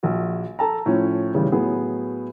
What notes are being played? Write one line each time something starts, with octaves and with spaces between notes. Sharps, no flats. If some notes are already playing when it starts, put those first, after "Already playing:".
A#1 F#4
A4 A5 A#5
A2 F3 C#4
D#2 A2 C#3 E3 G3
A2 F#3 B3 G#4